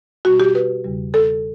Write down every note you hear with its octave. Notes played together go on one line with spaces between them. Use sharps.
B2 G3 F#4
G4
B4
E2 C#3 G3
A4